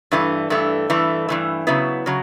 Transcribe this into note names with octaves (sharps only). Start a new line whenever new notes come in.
G2 E3 A3
G2 E3 A3
G2 E3 A3
G2 E3 A3
C#3 F#3 B3 E4
C#3 F#3